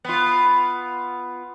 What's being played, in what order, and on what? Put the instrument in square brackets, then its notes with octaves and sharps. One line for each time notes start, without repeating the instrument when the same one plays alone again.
[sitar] B3 F4